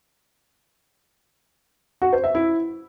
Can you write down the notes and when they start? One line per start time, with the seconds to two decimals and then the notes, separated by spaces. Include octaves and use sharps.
2.02 F#4
2.13 C5
2.24 E5
2.35 E4